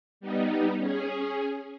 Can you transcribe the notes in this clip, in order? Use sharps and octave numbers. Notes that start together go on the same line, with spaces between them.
G3 B3 D#4
C#4 G#4